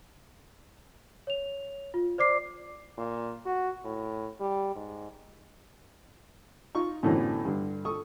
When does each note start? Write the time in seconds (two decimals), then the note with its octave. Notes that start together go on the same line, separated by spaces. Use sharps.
1.27 C#5 F7
1.94 F4
2.18 C5 D5 D6 C7
2.98 A#2
3.46 F#4
3.85 A2
4.40 G3
4.75 G#2
6.75 D#4 F4 C#6
7.03 F#2 A2 D3 E3 B3 C4
7.45 G2 D3
7.85 A4 C#6 D#6